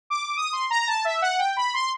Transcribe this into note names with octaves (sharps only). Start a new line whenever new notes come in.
D6
D#6
C6
A#5
A5
E5
F#5
G5
B5
C6